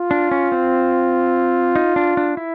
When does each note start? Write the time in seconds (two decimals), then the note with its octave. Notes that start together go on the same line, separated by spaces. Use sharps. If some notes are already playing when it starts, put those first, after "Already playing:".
Already playing: F4
0.11 D4
0.31 C#4
0.52 C4
1.76 D#4
1.96 D4
2.17 D4
2.37 E4